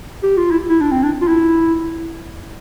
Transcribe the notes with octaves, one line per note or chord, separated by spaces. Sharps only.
G4
F4
E4
E4
D4
C4
D4
F4
E4